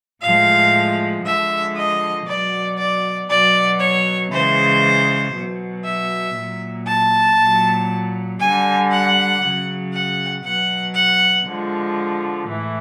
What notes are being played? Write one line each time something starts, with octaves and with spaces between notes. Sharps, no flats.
A2 F3 G#3 F5
D3 F3 G#3 E5
D#5
B2 F#3 D5
D5
B2 F#3 D5
C#5
C#3 E3 G#3 C5
B2 F#3
E5
A#2 F#3
A5
A#2 F#3
D3 G3 G#5
F#5
C#3 F#3
F#5
B2 F#3 F#5
F#5
D3 F3 G#3
A2 E3